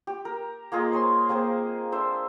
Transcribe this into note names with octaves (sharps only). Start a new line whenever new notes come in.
G4
A#4
A#3 F4 G#4 D#5
C5 C#5 G#5 C6
A#3 C4 G#4 C5
D4 C5 E5